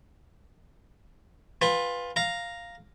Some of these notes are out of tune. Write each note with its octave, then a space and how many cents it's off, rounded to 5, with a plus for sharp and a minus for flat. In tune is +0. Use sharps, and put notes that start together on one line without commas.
F4 +15 B4 +0 G5 +45
F5 +0 A#5 +0